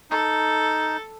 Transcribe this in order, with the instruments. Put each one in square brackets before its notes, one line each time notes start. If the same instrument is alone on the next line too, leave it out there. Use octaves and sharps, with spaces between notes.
[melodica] D#4 [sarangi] A4